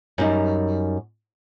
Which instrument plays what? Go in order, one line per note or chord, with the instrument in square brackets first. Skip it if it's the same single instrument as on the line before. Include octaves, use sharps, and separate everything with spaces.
[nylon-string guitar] F#2 G3 D#4